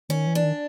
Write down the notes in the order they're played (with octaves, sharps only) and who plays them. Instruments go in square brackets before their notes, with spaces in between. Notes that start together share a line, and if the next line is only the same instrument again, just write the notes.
[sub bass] D#3 [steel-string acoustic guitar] C#4
[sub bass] E3
[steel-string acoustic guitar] D4
[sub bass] D#3